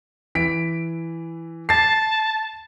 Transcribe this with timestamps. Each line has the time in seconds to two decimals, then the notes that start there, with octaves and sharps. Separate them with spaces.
0.35 E3 B6 D7
1.69 A5 A6 C7